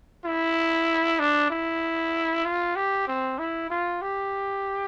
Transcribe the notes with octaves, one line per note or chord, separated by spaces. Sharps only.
E4
D4
E4
F4
G4
C4
E4
F4
G4